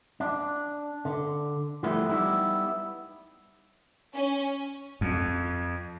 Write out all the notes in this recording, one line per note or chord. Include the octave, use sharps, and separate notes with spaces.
D4
D3
E3 F3 G3 A3 B3 E4
G3 B3 D#4 E4
C#4
F2